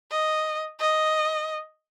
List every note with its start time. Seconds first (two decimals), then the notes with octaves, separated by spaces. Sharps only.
0.11 D#5
0.80 D#5